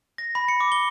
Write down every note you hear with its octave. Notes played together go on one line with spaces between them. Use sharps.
A#6
B5
C#7
D6
G7